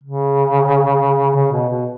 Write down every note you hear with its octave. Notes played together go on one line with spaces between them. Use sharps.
C#3
C#3
B2
B2